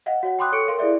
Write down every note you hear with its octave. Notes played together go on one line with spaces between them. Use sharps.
D#5 F5 F#5
F#4 C#5 F#5
G5 B5 C6 D6 D#6 F#6
A4 C#5 C#6 C#7 D7
A#4 F5 C6
E4 G#4 A4 D5 E5